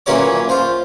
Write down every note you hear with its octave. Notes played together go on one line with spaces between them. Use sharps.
A#2 E3 F#3 C#4 C#5 D6
F4 C5